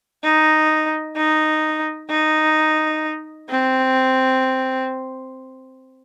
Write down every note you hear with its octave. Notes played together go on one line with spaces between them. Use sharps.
D#4
D#4
D#4
C4